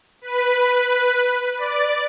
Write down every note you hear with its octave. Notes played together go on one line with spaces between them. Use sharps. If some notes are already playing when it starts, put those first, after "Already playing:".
B4
D5